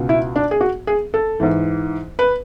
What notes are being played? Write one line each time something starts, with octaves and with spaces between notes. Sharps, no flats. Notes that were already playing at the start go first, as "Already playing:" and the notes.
Already playing: C#2 B2
E4
D4
G#4
F#4
G#4
A4
G#2 E3
B4